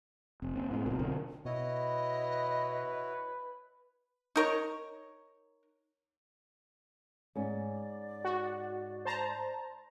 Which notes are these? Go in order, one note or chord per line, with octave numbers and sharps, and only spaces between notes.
F1 C4
A#3 C#4
A2 G#3 B3 C4
C2 B2 F4 F#4 A#4
B2 D3 F#3 C#4
B2 E4 F#4 B4 C#5 D#5
D#4 A#4 C#5
G#2 C#4 D5
F#4
C5 A5 A#5